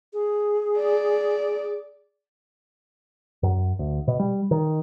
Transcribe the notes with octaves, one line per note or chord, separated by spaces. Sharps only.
G#4
D5
F#2
D2
B2
G3
D#3